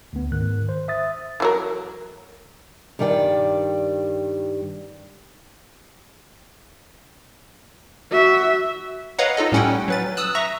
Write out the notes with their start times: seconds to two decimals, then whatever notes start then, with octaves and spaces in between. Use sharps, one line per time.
0.13 D2 B3
0.32 G#2 D#3 F#6
0.69 C5
0.88 E5 D#6 A6
1.40 E3 F#3 A#4
2.99 G2 D#3 G3 D5 G5
8.12 F#4 E5
9.18 B4 C#5 D#5 F5 F#5 A#5
9.37 D#4 F4 A4 D#5
9.52 A2 G3 C#4 F#5 G5
9.88 F#3 B4 A6
10.17 D#6 E6 F#6
10.35 E5 A#5 C#6 A#6